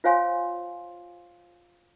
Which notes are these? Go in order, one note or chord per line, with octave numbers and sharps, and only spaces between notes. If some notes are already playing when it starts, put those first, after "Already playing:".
F4 C5 C#5 F5 G#5 C6